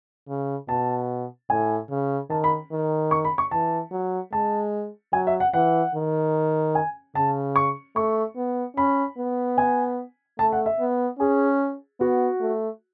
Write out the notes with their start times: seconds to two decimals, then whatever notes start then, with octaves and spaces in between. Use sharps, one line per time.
0.28 C#3
0.69 B2 A5
1.50 A2 G#5
1.90 C#3
2.30 D#3 A5
2.44 B5
2.71 D#3
3.11 C#6
3.25 B5
3.38 C#6
3.51 E3 A5
3.92 F#3
4.33 G#3 A5
5.13 F#3 G#5
5.27 E5
5.40 F#5
5.53 E3 F#5
5.95 D#3
6.75 G#5
7.15 C#3 A5
7.56 C#6
7.96 A3 C#6
8.36 B3
8.77 C#4 B5
9.18 B3
9.58 G#5
10.39 A3 A5
10.52 F#5
10.66 E5
10.80 B3
11.19 C#4 G#4
12.00 B3 F#4
12.40 A3